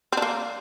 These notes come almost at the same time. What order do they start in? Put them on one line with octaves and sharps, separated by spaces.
C4 D4 A#3